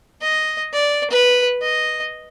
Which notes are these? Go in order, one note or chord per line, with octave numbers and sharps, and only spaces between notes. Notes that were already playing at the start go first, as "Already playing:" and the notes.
D#5
D5
B4
D#5